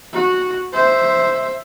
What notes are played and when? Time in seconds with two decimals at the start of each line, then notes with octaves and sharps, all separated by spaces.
0.13 F#4
0.73 C5 E5